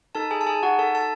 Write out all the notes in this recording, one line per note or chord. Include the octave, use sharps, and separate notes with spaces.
D#4 A4 A5
G#4 G#5
A5
G#4 G#5
F#4 F#5
A4 A5
A4 A5